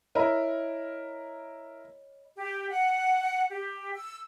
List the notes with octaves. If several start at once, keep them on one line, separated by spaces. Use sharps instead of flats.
E4 A#4 C#5 D#5 B5
G4
F#5
G4
E6